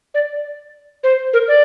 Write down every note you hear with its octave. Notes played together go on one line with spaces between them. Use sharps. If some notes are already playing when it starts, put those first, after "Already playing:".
D5
C5
A#4
D5